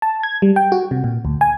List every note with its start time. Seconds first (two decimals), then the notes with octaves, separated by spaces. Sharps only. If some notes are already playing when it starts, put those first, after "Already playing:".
0.02 A5
0.23 G#6
0.42 G3
0.56 G5
0.72 F#4
0.91 C3
1.04 A#2
1.25 D2
1.41 G#5